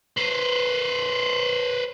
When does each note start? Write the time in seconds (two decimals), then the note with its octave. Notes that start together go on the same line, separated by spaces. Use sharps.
0.17 B4 C5